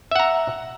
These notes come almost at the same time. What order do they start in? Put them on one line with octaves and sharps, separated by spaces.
E5 F#5 A#5